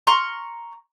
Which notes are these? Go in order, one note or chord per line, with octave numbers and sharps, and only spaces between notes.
A#5 C6 C#6 F6